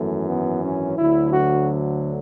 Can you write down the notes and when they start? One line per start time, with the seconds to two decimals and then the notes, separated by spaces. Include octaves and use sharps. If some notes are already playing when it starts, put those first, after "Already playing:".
Already playing: G#1 F#2 E3 A3
0.27 B3
0.62 C#4
0.97 D2 D3 F#3 E4
1.32 F#4